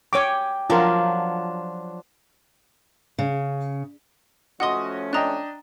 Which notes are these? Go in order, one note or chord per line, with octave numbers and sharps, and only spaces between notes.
G4 C#5 G5 G#5 D6
F3 F#3 D4 F4 A#4
C#3
F3 A3 C#4 F#4 D#5 F#5 C6 D#6
D4 D#5 G5 A#5 F#6